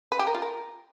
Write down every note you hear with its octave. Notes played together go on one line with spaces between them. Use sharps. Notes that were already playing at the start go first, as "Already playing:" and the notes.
B4
G4
A#4
F4
A#4